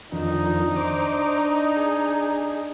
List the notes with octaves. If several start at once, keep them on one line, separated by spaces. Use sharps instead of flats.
F2 D#3 D4 D#4
C5 D6
G#4